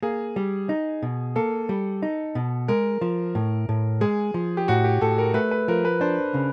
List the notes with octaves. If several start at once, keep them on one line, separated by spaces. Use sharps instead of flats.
A#3 G#4
G3
D#4
B2
A#3 A4
G3
D#4
B2
G#3 A#4
F3
A2
A2
G#3 G#4
F3
G4
A2 F#4
G4
A2 A4
A#4
A3 B4
B4
F3 A#4
B4
D4 C5
C#3